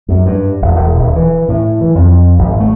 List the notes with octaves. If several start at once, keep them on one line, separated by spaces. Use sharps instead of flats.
F#2
G2
E1
E1
D#1
E3
A2
E3
F2
G#1
A3